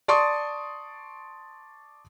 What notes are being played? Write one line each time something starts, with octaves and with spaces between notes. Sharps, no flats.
D5 A5 C6 C#6 D#6